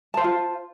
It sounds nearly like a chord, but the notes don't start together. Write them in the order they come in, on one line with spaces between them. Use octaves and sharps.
A5 C5 F5 F4